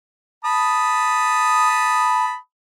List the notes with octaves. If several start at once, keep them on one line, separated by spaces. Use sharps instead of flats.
A5 B5 D#6